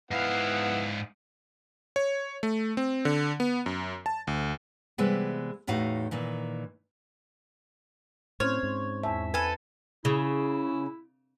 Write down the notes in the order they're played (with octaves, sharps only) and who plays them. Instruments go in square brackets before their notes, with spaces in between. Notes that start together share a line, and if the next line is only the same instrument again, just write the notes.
[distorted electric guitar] G#2 F5 [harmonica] B3 E4 F#5
[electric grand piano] C#5
A3
C4
D3
B3
F#2
A5
D2
[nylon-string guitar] C3 E3 G3 G#3 B3
E2 A2 D#4 F#4 F5
A#2 D#3 E3
[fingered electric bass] A2 [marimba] C4 F6 [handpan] C#4 C5 [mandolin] C#5
[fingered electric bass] G#2
[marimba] E2 A5 [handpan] E5
[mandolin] A4 G#5 [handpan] B4
[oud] C#3 [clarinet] E4